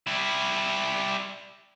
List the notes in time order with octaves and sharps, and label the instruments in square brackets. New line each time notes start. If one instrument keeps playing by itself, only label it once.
[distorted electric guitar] G3 E4